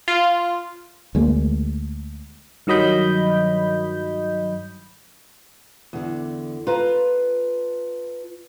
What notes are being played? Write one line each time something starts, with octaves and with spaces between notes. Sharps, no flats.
F4
D2 G#3 A#3
G2 D#3 F#3 D#5 B5 G6
E2 D3
F4 B4 A5 A#5